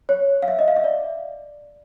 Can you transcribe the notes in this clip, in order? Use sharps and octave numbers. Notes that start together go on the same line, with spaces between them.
C#5
F5
E5
D#5
F5
E5
D5